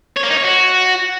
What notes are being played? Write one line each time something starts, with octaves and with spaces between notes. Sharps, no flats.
C#5
A#3
D#4
C#5
F#4